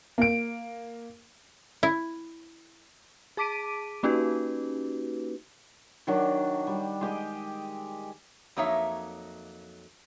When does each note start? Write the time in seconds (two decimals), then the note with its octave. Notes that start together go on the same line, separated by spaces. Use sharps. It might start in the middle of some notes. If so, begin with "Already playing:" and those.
0.18 A#3 D7
1.83 E4
3.37 G#4 A5 D6 B6 D7 D#7
4.03 A#3 C#4 D#4 F#4 G4 B4
6.07 D#3 F#3 D4
6.67 G3
7.01 G#3 G4 D#5
8.57 F2 F#3 A#3 D#4 C#5 E5